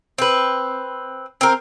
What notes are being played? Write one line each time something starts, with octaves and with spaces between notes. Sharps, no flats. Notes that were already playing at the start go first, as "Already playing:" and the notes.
C4 B4
C4 A#4